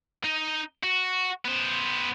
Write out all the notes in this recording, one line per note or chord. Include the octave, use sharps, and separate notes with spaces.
D#4
F#4
B3 C5